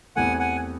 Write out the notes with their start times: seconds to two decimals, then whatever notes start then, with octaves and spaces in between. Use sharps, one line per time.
0.16 E2 C3 E3 A3 F#5 G#5
0.40 F#5 G#5